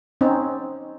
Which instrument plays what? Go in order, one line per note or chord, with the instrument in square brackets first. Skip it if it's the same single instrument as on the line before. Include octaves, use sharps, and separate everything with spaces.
[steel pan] C4 C#4 D#4